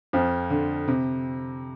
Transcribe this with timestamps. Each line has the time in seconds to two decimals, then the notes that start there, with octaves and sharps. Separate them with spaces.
0.13 F2 F3
0.50 D3
0.88 C3